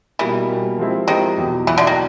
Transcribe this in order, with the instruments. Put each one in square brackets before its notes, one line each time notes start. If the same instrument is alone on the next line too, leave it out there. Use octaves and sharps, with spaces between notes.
[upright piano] B2 G3 A#3 [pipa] E3
[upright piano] B2 G3 A#3
F3 G#3 C4 E4 G4
[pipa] D#3 [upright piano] F3 G#3 C4 E4 G4
[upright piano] E2 B2 F#3
[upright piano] E2 B2 F#3 [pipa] E3
[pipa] D3
D#3